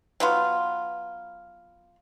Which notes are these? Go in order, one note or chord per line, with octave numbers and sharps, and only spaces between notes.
F#3 B3 F4